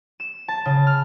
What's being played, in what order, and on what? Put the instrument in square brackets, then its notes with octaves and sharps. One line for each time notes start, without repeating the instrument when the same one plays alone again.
[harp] E7
A5
C#3
F6